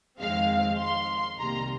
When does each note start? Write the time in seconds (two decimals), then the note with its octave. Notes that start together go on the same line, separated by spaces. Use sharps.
0.19 F2 D#3 G#3 C4 F5
0.79 C6
1.39 C2 C3 D#3 G3 A#3 A#5